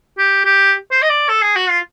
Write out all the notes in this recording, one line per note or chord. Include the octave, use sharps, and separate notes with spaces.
G4
G4
C5
D#5
D5
A4
G#4
F#4
F4